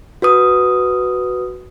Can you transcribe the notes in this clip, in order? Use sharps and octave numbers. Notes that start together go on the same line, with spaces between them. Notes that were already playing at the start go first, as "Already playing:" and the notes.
F#4 B4 D#6